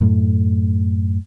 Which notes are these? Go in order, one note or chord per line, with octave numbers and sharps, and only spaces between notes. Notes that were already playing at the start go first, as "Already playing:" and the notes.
F#2 A2 A3